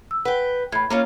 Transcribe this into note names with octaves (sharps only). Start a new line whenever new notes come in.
E6
B4 F#5 G5
A2 B5 G#6
A#3 C#4 F4